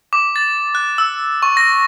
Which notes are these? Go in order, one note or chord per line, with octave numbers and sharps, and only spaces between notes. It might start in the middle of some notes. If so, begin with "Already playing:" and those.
D6
A6
F#6
E6
C#6
A#6